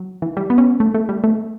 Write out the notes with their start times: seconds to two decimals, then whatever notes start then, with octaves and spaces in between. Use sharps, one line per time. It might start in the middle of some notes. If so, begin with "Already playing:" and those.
Already playing: F#3
0.22 E3
0.37 G3
0.50 B3
0.58 C#4
0.80 A3
0.95 A3
1.09 G3
1.24 A3